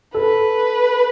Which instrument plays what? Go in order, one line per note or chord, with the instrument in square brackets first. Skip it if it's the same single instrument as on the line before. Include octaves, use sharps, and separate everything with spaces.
[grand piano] A4 [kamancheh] B4